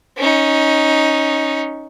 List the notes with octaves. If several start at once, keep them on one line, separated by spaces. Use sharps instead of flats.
C#4 D#4